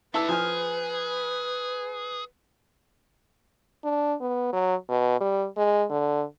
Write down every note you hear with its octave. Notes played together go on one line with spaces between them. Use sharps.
A3 D4 E4 B4 A5 E6
F3 G#4 G#5 F6
D4
B3
F#3
B2
G3
G#3
D3